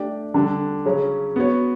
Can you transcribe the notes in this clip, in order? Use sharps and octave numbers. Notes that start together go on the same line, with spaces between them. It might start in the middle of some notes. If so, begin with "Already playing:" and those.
Already playing: A3 D4 G4 D5
D3 G3 D4 A4
C#3 F#3 C#4
B3 F#4 C#5